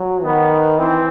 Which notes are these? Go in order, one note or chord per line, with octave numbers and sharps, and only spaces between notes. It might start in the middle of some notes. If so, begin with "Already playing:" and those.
Already playing: F#3
D#3 B3
E3 C4